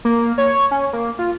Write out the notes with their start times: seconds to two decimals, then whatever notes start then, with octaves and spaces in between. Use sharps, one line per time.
0.05 A#3
0.38 C#5
0.71 C#4
0.93 A#3
1.19 F4